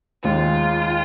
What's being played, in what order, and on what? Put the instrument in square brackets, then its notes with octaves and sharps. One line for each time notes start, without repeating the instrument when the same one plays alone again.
[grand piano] D#2 D#3 G#3 [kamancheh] F4